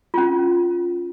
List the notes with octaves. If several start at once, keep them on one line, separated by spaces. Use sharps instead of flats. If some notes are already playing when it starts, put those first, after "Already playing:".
C#4 F4